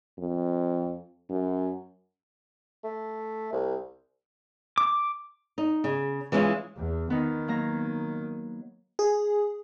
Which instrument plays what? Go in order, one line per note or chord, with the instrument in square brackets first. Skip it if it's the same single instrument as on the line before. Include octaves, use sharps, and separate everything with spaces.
[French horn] F2
F#2
[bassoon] A3
C2
[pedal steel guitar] D6
[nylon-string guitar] D#4
C#3
E3 G#3 B3 C#4 E4 F4
[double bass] E2
[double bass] D#3 [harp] B3 D#4
[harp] F#3 A#3 A#5
[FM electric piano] G#4